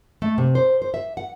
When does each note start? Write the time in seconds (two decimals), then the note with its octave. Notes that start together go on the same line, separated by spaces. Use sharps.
0.22 A3
0.38 C3
0.55 C5
0.82 C5
0.94 E5
1.17 F#5